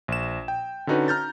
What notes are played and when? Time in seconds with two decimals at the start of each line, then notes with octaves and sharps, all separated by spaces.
0.08 A#1 E7
0.48 G5
0.87 D3 C#4 D#4 F#4 B4
1.08 A#5 F6 G6 A6